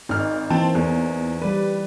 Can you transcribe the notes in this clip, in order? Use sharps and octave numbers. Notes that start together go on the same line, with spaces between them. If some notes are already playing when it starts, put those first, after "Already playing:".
G#1 D#4 F6
E3 A#3 C4 C5 A5
E2
G3 B4 D5